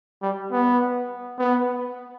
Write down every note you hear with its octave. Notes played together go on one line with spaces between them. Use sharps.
G3
B3
B3